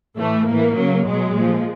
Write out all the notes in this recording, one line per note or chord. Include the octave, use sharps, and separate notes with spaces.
A2 E3 A3
A2 E3 A#3
C#3 F#3
B2 F#3 G#3
A#2
F3